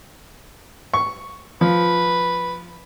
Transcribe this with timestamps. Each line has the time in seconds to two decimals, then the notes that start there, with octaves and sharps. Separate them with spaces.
0.94 C#6
1.61 F3 B4